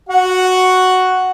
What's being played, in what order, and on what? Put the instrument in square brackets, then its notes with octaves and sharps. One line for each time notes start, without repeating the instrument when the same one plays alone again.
[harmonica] F#4 F#5